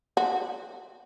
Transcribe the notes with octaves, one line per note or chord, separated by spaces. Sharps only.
F#4